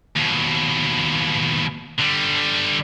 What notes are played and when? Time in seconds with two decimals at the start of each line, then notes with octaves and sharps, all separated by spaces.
0.16 D#2 B2
1.99 D3 G3